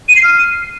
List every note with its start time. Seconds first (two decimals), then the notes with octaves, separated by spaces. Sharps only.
0.09 D#7
0.16 C7
0.23 F6